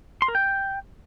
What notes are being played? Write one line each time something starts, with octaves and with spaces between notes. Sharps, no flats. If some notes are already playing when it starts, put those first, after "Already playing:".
C6
A#4
G5